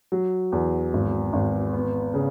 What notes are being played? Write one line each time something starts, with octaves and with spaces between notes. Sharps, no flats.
F#3
E2
G#1
G#1
B3
C#3